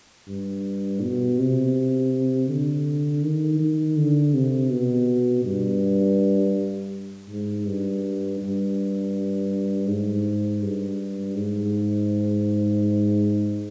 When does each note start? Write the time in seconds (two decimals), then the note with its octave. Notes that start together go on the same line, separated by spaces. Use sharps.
0.28 G2
1.02 B2
1.39 C3
2.49 D3
3.24 D#3
3.60 D#3
3.97 D3
4.34 C3
4.70 B2
5.45 G2
7.29 G#2
7.66 G2
8.40 G2
9.87 G#2
10.62 G2
11.35 G#2